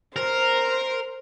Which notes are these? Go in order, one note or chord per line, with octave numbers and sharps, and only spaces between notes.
A#4 C5